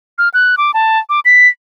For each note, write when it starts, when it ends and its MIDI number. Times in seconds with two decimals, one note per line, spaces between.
0.18 0.29 89
0.34 0.56 90
0.58 0.71 86
0.74 0.99 81
1.09 1.20 86
1.25 1.48 95